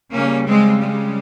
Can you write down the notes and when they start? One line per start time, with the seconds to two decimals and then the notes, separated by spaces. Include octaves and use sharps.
0.13 C#3 G3 A#3 C#4
0.47 G#3 C4
0.81 G#3